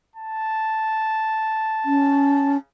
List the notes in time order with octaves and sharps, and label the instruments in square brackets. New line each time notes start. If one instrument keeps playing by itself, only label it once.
[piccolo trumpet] A5
[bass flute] C#4